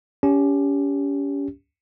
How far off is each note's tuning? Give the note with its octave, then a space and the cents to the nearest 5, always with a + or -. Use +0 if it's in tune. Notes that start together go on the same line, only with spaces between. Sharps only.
C#4 +30 G4 +10